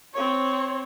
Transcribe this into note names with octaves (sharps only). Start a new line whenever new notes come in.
C4 C#5